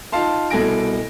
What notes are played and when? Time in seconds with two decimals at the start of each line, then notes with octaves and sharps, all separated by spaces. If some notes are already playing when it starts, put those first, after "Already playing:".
0.12 D#4 F4 F5 A5 C6
0.50 C2 B2 A4 G#5 A#6 D7